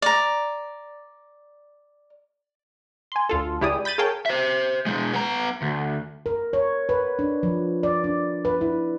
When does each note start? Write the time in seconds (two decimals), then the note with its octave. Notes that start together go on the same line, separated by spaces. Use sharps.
0.02 D5 A#5
3.12 G#5 C6
3.29 D2 F4 A4
3.61 C#2 E4 G4 G#4 D5 D#6
3.85 B5 G6 A6 D#7
3.98 G#4 A#4 C#5 F5 G5 A5
4.26 C5 E5
4.86 B2 G#3
5.13 B3 A#5
5.62 D2
6.26 A#4
6.53 C#5
6.89 B4
7.19 D4
7.43 F3
7.83 D5
8.04 D4
8.45 B4
8.61 E4